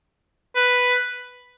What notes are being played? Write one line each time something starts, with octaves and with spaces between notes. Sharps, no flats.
B4